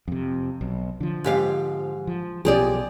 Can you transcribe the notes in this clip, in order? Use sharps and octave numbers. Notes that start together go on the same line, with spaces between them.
F2 C3
B1
D3 F3
G#2 G4 F5
F3
B1 B2 F3 G4 G#4 D5